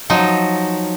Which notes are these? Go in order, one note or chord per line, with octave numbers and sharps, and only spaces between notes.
F3 F#3 D#4